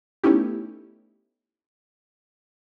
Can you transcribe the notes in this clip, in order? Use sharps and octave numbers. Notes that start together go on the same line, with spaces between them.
A3 B3 C#4 D#4 E4 G4